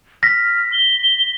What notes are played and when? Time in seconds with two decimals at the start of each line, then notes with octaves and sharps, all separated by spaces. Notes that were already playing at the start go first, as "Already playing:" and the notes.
0.23 F6 A#6 B6
0.72 G7